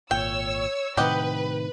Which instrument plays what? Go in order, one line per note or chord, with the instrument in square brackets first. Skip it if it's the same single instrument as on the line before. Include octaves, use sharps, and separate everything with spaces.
[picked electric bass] G#1 A#2 [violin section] C#5 E6 [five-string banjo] G5
[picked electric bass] A2 C3 D#3 [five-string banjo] G4 D#5 F#5 [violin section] B4